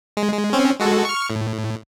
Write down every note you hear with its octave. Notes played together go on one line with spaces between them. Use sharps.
G#3
G#3
C4 C#4
G#3 F#4 A4
C#6 F6
A2